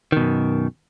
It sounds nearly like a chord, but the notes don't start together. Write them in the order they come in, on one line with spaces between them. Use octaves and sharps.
D#3 B2 F#2